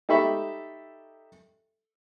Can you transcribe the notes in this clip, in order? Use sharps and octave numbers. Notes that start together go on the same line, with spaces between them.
D#4 G4 A4 E5 B5 C#6